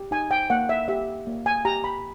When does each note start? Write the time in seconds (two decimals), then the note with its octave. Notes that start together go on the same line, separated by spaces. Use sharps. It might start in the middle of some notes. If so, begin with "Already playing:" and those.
Already playing: G4
0.11 D#4 G#5
0.31 G5
0.50 A#3 F#5
0.69 E5
0.88 G4 E5
1.27 A#3
1.46 G#5
1.65 G4 A#5
1.84 B5